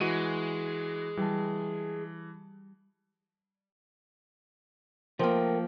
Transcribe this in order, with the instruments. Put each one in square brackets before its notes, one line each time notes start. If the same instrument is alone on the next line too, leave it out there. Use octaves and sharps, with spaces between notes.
[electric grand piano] E3 F#4 D#7 [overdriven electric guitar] G#3
[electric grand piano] E3 [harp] G3 A5
[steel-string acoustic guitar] F3 A#3 [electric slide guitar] A3 A#4 G5